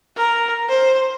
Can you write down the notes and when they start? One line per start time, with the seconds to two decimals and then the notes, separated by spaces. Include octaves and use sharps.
0.17 A#4
0.68 C5